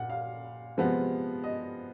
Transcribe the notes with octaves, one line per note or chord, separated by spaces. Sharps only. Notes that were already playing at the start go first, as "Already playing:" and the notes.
Already playing: A#2 F#5
F5
C3 F3 G#3 B3
D#5